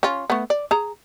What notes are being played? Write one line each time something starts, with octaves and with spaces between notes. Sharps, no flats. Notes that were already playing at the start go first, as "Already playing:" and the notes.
C#4 F4
A3 B3
D5
G#4 A#5